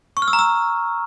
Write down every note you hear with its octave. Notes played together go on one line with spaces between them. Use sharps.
C#6
F6
E6
A#5
E6